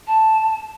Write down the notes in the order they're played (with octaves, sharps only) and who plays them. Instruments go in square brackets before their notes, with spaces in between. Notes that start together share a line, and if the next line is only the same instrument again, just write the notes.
[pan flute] A5